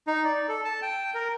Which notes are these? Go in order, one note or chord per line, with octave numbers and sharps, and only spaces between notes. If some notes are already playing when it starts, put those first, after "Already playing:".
D#4
D5
A4
A5
G5
A#4